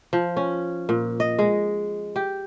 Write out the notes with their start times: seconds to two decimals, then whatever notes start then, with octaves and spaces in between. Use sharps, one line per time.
0.13 F3
0.37 C#4
0.89 A#2
1.20 D#5
1.39 G#3
2.16 G4